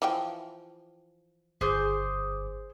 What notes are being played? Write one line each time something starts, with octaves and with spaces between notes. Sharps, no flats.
E3 F3 G5
G1 G#4 C5 D6 G6